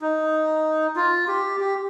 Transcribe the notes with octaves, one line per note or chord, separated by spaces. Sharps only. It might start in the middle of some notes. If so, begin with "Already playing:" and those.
D#4
F4
G4
G4